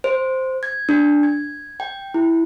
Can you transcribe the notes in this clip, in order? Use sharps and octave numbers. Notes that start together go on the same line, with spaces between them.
C5
G#6
D4
G#6
G5
E4